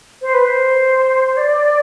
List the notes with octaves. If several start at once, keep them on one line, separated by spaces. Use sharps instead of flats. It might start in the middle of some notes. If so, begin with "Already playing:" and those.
C5
B4
C5
D5